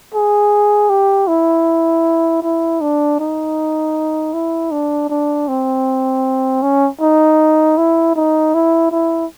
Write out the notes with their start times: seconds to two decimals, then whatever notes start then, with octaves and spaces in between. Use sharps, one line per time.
0.14 G#4
0.89 G4
1.28 E4
2.43 E4
2.81 D4
3.20 D#4
4.34 E4
4.72 D4
5.09 D4
5.48 C4
6.62 C#4
7.01 D#4
7.78 E4
8.16 D#4
8.54 E4
8.92 E4